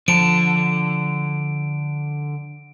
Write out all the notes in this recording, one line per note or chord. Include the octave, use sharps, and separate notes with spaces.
D3 F3 A5 D7